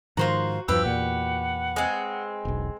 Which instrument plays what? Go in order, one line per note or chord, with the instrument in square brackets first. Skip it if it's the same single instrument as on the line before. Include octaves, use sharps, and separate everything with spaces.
[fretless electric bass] G#2 D#3 F3 [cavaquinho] F4 C5 A#5 [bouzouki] F#4
[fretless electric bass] E2 G2 F3 [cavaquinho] G4 B4 G5 [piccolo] E6
[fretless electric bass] E2 A#2 [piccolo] F#5
[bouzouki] G#3 C4
[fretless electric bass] E1 B1